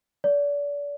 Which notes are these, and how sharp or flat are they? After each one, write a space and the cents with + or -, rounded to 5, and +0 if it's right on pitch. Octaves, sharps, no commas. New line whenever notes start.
D5 -35